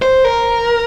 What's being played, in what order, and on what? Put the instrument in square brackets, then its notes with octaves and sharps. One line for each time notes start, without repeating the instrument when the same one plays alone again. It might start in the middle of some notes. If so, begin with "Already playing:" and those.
[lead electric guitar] C5
A#4